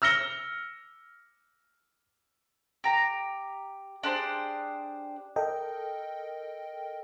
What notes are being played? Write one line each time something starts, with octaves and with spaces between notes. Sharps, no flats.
E6 F6 A#6 C#7 G7
G4 A#5
D4 G4 G#4 C5
A4 A#4 D#5 G5